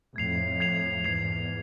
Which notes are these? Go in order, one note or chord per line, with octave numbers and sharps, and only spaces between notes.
F2 A2 G#6 C7 F7
G#6 C7 F7
E2 G#2 G#6 C7 F7